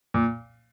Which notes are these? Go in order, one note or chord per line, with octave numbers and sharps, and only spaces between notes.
A#2